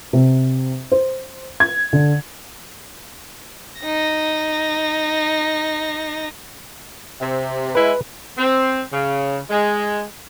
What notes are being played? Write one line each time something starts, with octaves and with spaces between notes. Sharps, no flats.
C3
C5
G#6
D3
D#4 A#6
C3
G#3 E4 B4
C4
C#3
G#3